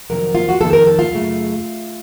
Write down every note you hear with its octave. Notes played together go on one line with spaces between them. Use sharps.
F2 C3 D#3 F#3 A#4
F4
F#4
F2 C3 D#3 A4
A#4
A4
F4
F#2 C#3 A3